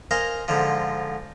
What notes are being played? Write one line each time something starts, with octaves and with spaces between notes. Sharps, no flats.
A#4 C5 D#5 F5 G#5 A#5
G#2 D3 F3